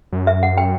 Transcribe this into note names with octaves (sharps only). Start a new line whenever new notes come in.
F#2
E5
F#5
G5